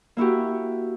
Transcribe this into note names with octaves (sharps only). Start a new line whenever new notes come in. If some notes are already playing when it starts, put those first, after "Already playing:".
A#3 E4 F#4 G4